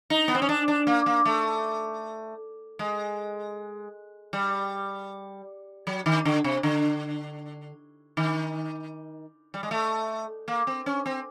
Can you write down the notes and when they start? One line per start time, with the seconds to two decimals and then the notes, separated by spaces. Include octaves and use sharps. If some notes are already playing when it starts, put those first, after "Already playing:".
0.10 D#4
0.28 B3
0.35 C4
0.42 C#4
0.49 D4
0.68 D4
0.87 A#3
1.06 A#3
1.25 A3
2.79 G#3
4.33 G3
5.87 F#3
6.06 D#3
6.25 D3
6.44 C3
6.63 D3
8.17 D#3
9.54 G3
9.63 G#3
9.71 A3
10.48 A#3
10.67 C4
10.86 C#4
11.06 C4